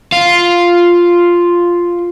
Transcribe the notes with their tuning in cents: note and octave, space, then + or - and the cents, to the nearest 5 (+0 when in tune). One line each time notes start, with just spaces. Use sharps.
F4 +0